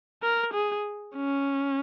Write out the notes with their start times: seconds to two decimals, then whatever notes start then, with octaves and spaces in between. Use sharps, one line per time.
0.22 A#4
0.53 G#4
1.15 C#4